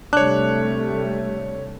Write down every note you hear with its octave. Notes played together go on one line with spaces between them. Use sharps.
C3 G3 A3 D4 C#5 F#6